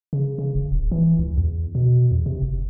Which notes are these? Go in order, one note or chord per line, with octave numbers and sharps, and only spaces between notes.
C#3
C#3
F1
D1
E3
C#2
E2
B2
E2
C3
F#1